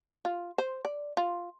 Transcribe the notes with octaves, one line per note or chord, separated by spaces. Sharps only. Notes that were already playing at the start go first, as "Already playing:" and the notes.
F4
C5
D5
F4